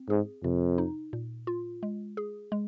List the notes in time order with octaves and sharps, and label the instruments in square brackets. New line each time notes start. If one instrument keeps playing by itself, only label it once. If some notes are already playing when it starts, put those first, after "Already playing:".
Already playing: [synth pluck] C4
[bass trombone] G#2 [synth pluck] G#4
[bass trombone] F2 [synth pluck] C3
[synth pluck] D#4
A#2
F4
G#3
G#4
G#3